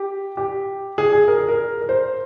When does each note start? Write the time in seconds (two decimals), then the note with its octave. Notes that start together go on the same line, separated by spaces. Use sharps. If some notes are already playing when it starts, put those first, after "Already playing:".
Already playing: G4
0.37 G4
0.98 G#4
1.13 G#4
1.28 A#4
1.38 G#4
1.48 A#4
1.81 A#4
1.89 C5